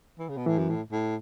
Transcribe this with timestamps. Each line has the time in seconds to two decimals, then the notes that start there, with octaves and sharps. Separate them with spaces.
0.19 E3
0.29 C#3
0.37 B2
0.46 A2 E3
0.58 F#2
0.70 A2
0.92 A2